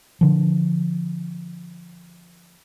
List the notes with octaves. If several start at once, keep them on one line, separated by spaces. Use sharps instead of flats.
D3 F3